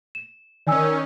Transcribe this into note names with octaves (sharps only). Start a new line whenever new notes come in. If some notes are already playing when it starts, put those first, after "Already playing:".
E7
D#3 C#4 D5 G#5 E6